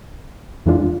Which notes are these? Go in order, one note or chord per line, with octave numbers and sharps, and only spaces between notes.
F2 E3 G#3 D4 F4